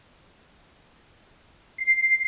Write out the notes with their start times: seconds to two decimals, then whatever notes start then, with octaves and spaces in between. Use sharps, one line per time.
1.78 C7